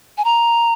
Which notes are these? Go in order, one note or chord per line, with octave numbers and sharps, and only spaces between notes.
G#5
A#5